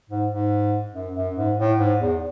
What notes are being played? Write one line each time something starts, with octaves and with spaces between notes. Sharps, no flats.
G#2
G#2
F#2
F#2
G#2
A2
G#2
E2